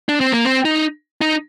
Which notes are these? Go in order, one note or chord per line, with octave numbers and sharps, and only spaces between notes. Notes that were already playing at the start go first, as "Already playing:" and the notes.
D4
C4
A#3
C4
D#4
D#4